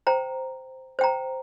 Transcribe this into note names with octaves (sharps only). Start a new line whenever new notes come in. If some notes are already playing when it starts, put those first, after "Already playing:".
C5 G5 A#5
C5 G5 A#5